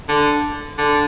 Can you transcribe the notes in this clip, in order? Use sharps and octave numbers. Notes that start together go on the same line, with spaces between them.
D3
D3